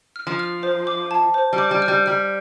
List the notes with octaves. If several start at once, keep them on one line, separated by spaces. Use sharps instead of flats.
F6
F3
F6
C5
D6
A5
C5
G3
D6
G3
F6
G3
G3 F6